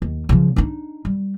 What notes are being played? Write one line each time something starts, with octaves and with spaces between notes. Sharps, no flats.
D#2
C#3 F3
D4 D#4
G3